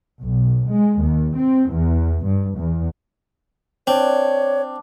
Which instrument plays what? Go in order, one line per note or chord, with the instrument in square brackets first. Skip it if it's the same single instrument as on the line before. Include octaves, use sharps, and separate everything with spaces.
[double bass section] B1
G#3
D#2
C4
E2
G2
E2
[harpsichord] C4 [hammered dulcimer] D4 [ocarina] C#5